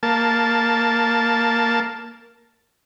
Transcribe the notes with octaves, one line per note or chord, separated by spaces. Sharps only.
A#3 A5